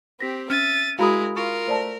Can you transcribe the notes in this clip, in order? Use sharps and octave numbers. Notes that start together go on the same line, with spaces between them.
C4 G4 A#6 B6
C#4 E5 F6 A6 D#7
G#3 E4 F#4 A#4 F5 A#5 B5 D#6
F4 A#4 C#6
A3 C5 D5 A5